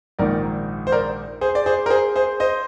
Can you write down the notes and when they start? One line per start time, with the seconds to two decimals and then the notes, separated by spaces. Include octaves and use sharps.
0.19 A#1 G#2 D#3 A#4 D5
0.87 C5
0.92 A#4 D5
1.41 G#4 C5
1.55 D5
1.66 G#4 C5
1.86 A#4
1.90 G#4 C5
2.16 G#4 C5
2.40 C5 D#5